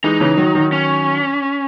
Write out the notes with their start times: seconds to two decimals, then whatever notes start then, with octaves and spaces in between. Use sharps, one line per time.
0.04 E3 G#3 D#4
0.20 C#3 E3
0.37 D#3 F#3
0.55 D#3 F#3
0.72 C#4